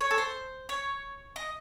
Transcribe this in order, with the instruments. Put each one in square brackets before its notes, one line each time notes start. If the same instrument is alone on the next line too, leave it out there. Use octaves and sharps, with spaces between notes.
[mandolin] C#5
A4
C5
C#5
D#5